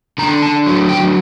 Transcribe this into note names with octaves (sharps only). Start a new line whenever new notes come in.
D3 A#5
A5
F#3
G5